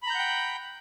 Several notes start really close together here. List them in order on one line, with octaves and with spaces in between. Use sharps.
B5 A#5 G6 F#5 G5